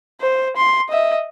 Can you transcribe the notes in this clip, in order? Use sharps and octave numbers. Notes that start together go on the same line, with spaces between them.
C5
C6
D#5 E5